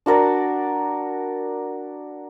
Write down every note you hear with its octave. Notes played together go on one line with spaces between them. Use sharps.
D4 F#4 A#4 D5